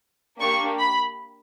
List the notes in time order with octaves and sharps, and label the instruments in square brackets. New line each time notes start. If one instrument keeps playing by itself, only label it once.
[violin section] A#3 D4 G4 C#6
B5